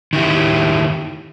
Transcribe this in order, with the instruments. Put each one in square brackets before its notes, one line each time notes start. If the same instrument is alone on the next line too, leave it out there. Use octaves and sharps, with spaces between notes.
[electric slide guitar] D#3 E4 G4